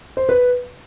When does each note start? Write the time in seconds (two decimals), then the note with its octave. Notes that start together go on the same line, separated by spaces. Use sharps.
0.17 C5
0.29 B4